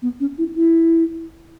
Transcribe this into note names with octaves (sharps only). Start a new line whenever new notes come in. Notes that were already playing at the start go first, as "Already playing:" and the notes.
B3
C#4
E4
E4